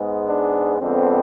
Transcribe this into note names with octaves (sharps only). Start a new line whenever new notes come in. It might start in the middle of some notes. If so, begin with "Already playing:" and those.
Already playing: G#2 G#3 B3
D4
F2 D3 G#3 B3 C4